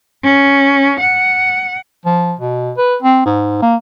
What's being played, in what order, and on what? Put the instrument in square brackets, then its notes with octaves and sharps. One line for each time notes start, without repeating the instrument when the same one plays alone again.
[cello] C#4
F#5
[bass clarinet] F3
B2
B4
C4
G#2
A#3